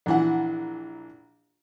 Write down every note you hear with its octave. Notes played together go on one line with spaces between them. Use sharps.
A#1 E3 F#5